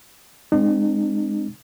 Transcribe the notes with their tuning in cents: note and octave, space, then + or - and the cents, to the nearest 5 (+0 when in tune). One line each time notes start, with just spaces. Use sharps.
G#3 +0 C4 +0 D#4 -40